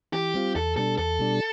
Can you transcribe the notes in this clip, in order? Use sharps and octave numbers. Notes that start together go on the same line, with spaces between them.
E3 G4
G3 C4 F4
E2 A4
B2 G3 D4 A4
E2 A4
B2 G3 D4